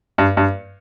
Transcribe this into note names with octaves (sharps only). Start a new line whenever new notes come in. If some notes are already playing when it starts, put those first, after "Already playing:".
G2
G2